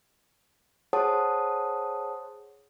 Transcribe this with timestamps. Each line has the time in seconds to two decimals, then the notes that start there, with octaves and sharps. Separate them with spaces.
0.93 G#4 C5 C#5 F#5 A5 D#6